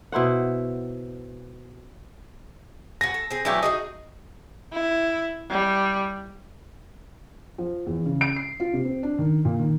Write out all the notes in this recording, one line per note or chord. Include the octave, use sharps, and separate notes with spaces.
B2 E4 C5 F#5
F#4 B4 G#5 A#6
A4
C4 G#4
E3 F#3 A3 D4 E4 G4
D#4 F#4 G#4 D#5
E4
G3
F3
E2
C#3
D7
C7
F4
C3
C4
D4
D#3
A#2
D#3